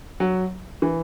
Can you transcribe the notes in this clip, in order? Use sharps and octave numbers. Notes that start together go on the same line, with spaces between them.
F#3
E3